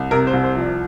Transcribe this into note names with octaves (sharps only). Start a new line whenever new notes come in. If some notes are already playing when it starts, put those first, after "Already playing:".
Already playing: C2
C3 A#4
C5
C2
C5
F3 D5